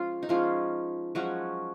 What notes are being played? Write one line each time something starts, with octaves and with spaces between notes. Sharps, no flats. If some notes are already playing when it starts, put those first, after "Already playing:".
Already playing: F3 G#3 C#4 F4
D#4
F3 G#3 C#4 F4
F3 F#3 G#3 C#4 F#4